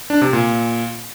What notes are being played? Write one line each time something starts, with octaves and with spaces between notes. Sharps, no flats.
D4
C3
A#2